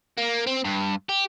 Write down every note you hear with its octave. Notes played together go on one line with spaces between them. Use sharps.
A#3
C4
G2
G4